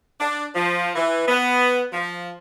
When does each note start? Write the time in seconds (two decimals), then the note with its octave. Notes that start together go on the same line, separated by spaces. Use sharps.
0.20 D4
0.55 F3
0.96 E3
1.28 B3
1.93 F3